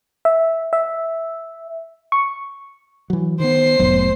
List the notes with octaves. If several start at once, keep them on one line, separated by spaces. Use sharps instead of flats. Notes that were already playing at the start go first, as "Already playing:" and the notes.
E5
E5
C#6
E3 F#3
D#3 B3 C5 C7
F1 A2 F#3 B3